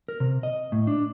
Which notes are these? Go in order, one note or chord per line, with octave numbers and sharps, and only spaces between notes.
A#4
C3
D#5
A2
D4